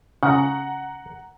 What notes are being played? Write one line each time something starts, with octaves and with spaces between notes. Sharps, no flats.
C#3 F#5 A#5